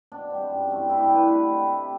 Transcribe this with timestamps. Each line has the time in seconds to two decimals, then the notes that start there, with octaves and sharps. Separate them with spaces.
0.12 B2 D4
0.30 G3 C4
0.50 F#2
0.69 E3 A3 C4
0.89 G2 E4
0.98 G4 A4
1.09 D3 A3 C4
1.16 B4
1.28 B2 B4
1.48 A3 C4
1.67 C3